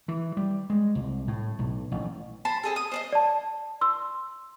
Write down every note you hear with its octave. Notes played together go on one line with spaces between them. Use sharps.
E3
G3
G#3
C2
A2
B1
A1
C5 A5 B5 C6
C4 G#4 A4
D#6
C5 D5 D#5
D5 A5
C6 E6